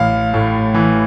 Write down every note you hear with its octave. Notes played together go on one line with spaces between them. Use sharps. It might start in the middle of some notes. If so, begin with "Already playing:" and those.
Already playing: A1 F5
A2
E3